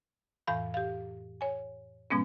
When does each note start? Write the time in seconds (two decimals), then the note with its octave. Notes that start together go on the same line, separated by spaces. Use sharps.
0.47 F2 A2 E3 F5 B5
0.74 G4 F5
1.41 C#5 G#5
2.10 G#2 B2 F3 G#3 B3 C#4